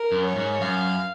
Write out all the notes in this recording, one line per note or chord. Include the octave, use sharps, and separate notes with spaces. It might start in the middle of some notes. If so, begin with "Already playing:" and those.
Already playing: A#4
F#2
C#5
G#2
F#2 F5